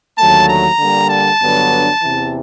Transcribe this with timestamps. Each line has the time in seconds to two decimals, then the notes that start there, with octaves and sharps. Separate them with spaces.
0.18 D#2 D3 F#3 A3 A5
0.49 A#5
0.79 D3 G3 A#3
1.10 A5
1.41 G2 D3 F#3 B3 D4
2.02 E2 C3 E3